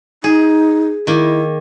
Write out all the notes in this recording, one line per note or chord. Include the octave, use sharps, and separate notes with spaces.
D#4 G#4
D#3 A#3 E4